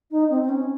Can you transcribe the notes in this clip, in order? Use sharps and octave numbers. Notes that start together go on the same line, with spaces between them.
D#4
C4
C4
C#4